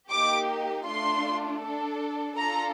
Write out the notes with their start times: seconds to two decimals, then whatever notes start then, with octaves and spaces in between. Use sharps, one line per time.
0.10 A#3 D#4 G4 D6
0.86 A3 D4 F4 C6
1.62 D4 A4
2.37 D4 F4 A4 A#5